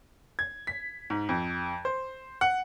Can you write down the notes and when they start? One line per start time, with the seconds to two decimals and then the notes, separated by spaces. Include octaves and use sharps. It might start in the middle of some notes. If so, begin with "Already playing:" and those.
0.39 G#6
0.67 B6
1.10 G#2
1.29 F2
1.85 C5
2.41 F#5